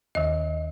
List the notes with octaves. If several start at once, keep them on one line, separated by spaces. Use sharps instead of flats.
D#2 D#3 D#5